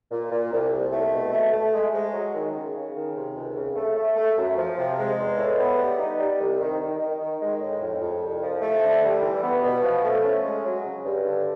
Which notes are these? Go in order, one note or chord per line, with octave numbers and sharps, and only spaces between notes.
A#2
A#2
C2
C2
A3
B2
A3
A3
G#3
G#3
F#3
D#3
C#3
C#3
D#3
C3
C#2
C#3
A3
A3
A3
F#2
F3
C3
G#3
E2
A2
B3
G3
D#4
G3
C2
D#3
D#3
D#3
D#3
G#3
A2
F2
F2
C2
F3
A3
D3
G3
E3
B3
B2
F3
A3
C#4
G#3
F#3
C#3
G2
D3